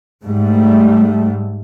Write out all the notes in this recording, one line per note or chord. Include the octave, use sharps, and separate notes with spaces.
G#2 G3 A3